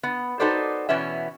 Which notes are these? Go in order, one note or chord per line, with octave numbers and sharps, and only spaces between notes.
B3
D#4 F#4 A4 B4 C5 D5
B2 E3 B3 C#4 E5